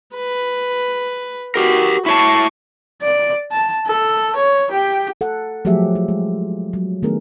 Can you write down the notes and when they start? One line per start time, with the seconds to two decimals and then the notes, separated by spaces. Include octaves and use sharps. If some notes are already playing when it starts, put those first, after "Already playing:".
0.15 B4
1.56 F#4 G4 A#4
2.06 E4 C#5 A5 C#6 D6
3.02 D5
3.52 A5
3.87 A4
4.36 C#5
4.72 G4
5.21 A4 F#5
5.65 F3 F#3 A3 G4 G#4 E5
5.95 F4
6.08 G#3
6.73 F#3
7.03 D#3 A3 B3 D4 G#4 A#4